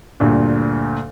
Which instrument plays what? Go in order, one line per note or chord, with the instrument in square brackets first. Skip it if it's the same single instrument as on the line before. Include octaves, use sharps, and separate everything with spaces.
[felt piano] D2 G2 A#2